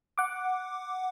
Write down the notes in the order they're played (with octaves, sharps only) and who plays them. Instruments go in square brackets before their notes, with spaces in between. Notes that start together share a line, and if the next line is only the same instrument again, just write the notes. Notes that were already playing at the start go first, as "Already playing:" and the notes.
[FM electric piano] F#5 D6